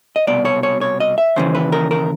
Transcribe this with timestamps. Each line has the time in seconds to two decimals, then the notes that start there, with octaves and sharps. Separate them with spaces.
0.16 D#5
0.27 C2 B2 D5
0.45 C#5
0.63 C#5
0.81 C#5
1.00 D#5
1.18 E5
1.36 D#2 C#3 E3 C5
1.55 B4
1.72 A#4
1.91 A#4